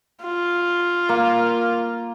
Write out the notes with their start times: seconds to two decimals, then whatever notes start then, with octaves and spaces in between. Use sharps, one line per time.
0.24 F4
1.09 A#3